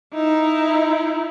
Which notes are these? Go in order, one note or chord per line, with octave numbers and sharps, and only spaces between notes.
D#4 E4